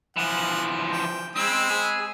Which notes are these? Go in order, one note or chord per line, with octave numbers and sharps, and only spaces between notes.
E3 F3 F#5
G5
G#3 C4 B5 E6
G#4